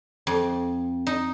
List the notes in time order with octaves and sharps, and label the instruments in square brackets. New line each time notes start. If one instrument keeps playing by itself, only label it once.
[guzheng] F2
D#4